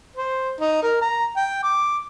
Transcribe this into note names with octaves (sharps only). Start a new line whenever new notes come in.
C5
D#4
A#4
A#5
G5
D6